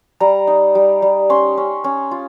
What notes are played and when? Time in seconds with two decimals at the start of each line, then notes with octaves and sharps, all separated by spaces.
0.20 G3 A#5
0.47 D#4
0.75 G3
1.02 G3
1.30 C#4 C6
1.57 C#4
1.84 C#4
2.11 F4